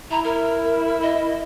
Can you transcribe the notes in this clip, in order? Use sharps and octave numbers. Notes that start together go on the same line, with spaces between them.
E4 A#5
A#4
D#5